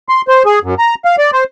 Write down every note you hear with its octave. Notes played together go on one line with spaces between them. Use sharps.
C6
C5
G#4
F#2
A#5
F5
D5
C5